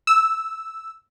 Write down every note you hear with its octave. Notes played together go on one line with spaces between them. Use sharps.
E6